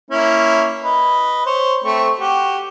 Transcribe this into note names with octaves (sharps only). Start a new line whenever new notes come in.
A#3 C#4 E4
B4 D#5
C5 C#5
A3 C4 C#6
F#4 G4